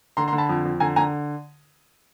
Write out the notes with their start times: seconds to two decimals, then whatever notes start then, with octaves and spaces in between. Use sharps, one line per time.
0.17 D3 A#5 C6
0.28 A#5 C6
0.33 D3
0.38 A5 B5
0.49 F2
0.65 F2
0.80 D3 G#5 A#5
0.96 D3 G#5 A#5